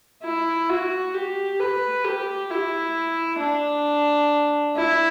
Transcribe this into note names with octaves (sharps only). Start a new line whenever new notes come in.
E4
F#4
G4
B4
G4
E4
D4
E4